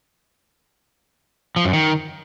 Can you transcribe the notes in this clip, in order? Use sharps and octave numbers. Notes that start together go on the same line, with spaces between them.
F3
F#2
D#3